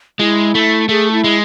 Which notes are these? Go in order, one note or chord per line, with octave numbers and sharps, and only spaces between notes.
G#3 E4 F4
A3
A3 G#4
E4
G#3